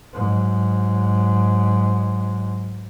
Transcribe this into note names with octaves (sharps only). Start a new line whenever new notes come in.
G#2 F#3